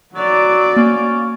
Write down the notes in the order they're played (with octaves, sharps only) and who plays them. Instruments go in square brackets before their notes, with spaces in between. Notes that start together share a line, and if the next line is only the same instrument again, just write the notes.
[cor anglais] F#3 [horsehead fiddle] F#4 D5
[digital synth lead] A#3 [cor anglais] C#4